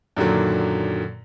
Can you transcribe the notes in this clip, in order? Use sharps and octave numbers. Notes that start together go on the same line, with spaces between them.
F#2 A#2 D3 D#3 F#3